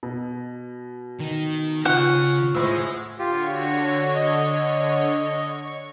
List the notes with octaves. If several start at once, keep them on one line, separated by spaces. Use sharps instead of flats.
B2
D#3
C#3 F4 C#5 F#5 C#6
A2 G#3 C5 E6
D3 F4 G4 C#5
F#4
D#5
C#6